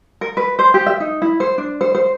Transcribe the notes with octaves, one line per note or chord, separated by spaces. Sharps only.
A#4
B4
C5
G4
E5
D#4
E4
C5
D4
C5
C5